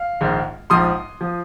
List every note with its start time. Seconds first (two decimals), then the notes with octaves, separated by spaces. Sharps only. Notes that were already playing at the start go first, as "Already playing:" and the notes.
Already playing: F5
0.21 A#1 G#2 D#3 G#3
0.70 A#1 G#2 F3 C6 D#6
1.21 F3